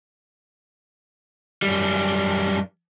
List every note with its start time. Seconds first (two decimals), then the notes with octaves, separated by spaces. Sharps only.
1.62 F#2 G3